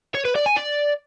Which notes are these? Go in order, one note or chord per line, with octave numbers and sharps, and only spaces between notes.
C#5
B4
D5
G#5
D5